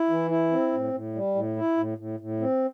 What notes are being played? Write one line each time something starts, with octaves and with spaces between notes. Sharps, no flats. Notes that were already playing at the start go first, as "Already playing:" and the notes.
Already playing: E4
E3
E4
C4
A2
A2
G3
A2
E4
A2
A2
A2
C4